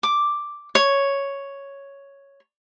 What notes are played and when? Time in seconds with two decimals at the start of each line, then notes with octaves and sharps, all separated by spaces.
0.03 D6
0.75 C#5